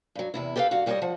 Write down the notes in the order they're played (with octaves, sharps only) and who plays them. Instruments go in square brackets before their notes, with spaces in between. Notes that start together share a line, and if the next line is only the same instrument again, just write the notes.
[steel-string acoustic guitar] G2 F#3
E2 C3 E4
G4 A4 B4 D#5 F5
G2 F#4 F5 F#5
A2 G3 F4 A#4 C#5 D#5
F3 F#5